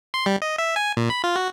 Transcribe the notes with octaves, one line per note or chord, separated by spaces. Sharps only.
C6
G3
D#5
E5
G#5
A#2
B5
F4
F#4